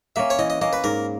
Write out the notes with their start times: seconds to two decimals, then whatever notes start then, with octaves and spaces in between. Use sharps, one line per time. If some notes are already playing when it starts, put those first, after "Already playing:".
0.16 A#3 C#4 E5
0.30 C#5
0.39 E3 D#5
0.50 D#5
0.61 A#3 C#4 D#5
0.73 B4
0.84 G#2 A#4